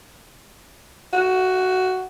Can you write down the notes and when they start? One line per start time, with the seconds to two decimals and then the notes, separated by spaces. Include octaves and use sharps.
1.13 F#4